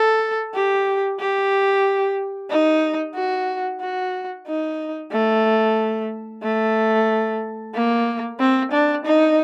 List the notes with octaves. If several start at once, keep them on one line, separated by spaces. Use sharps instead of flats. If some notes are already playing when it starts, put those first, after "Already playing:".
Already playing: A4
G4
G4
D#4
F#4
F#4
D#4
A3
A3
A#3
C4
D4
D#4